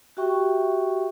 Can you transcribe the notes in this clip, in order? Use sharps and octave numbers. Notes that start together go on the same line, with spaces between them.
F#4 G4 E5 G5 C#6